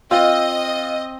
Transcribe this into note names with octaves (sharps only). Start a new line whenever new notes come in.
C4 F4 D#5